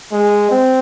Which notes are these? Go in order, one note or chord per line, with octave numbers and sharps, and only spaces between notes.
G#3
C4